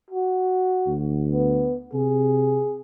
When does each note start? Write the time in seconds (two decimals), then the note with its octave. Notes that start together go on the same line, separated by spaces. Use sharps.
0.10 F#4
0.87 D2
1.31 B3
1.93 C3 G#4